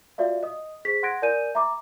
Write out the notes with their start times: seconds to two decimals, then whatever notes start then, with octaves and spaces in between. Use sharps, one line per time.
0.18 F4 F#4 D5 E5 F5
0.43 D#5 D#6
0.85 G#4 C5 B6
1.03 F#5 C6 F#6 G#6 A#6 D7
1.22 A#4 D5 G#5 G6 D#7
1.55 E5 A#5 B5 D6